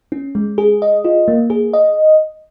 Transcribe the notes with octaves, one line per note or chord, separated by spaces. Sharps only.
C#4
G#3
G#4
D#5
F4
A#3
G#4
D#5